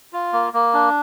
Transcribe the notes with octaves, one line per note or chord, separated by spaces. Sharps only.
F4
A#3
A#3
D4